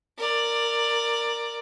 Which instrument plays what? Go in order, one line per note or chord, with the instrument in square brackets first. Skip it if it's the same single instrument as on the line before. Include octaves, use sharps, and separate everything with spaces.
[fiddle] A#4 D5